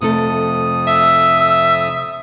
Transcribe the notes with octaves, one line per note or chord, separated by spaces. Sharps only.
F2 C3 A3 A4 D#6
E5 E6